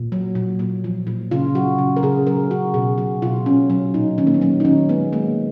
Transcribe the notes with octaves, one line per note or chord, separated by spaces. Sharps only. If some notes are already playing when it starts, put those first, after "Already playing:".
Already playing: A#2
F#3
A#2
A#2
F3
A#2
C#3 F4
F#3 F#4
C#3
A#4
C#3 G#4
F#3 A#4
C#3 F#4
B2 G#4
F#3 F#4
B2 F4
A#2 C#4
F#3 C#4
A#2 D#4
D#3 C#4
A#3
B3
F#3 C#4
D#4
D#3 C#4
G#3 B3
G#3 A#3